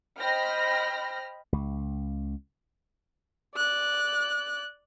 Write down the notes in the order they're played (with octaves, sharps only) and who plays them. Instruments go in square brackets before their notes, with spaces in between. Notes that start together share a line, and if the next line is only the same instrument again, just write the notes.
[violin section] C5 D#5 G5 B5 F6 A#6
[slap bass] C#2
[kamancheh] D5 F#6